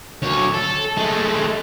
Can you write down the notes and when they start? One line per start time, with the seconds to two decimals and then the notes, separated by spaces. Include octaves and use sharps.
0.22 D2 C#5
0.54 A4
0.97 G#3 A3